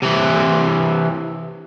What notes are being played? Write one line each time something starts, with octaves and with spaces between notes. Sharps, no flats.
C3 E3